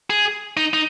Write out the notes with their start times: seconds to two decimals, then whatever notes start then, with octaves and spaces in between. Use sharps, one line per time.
0.10 G#4
0.57 D#4
0.73 D#4